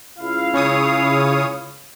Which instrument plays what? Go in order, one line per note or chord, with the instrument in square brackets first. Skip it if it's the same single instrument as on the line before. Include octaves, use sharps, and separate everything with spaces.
[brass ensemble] C#2 E4 F5
[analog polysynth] C#3 C#5 D#6